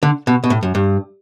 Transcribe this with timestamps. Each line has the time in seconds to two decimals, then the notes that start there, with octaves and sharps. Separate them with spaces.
0.03 D3
0.27 B2
0.44 B2
0.50 A2
0.63 F#2
0.75 G2